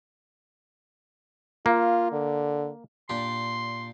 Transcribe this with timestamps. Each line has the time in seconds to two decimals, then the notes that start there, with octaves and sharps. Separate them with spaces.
1.66 A#3 F4
2.12 D3
3.09 A#2 D4 G4 C6